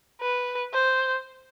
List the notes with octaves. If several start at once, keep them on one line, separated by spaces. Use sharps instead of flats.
B4
C5